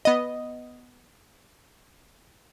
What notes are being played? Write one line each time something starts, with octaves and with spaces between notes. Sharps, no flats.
B3 D#5